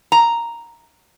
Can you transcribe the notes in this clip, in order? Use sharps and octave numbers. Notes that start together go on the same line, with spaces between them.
A#5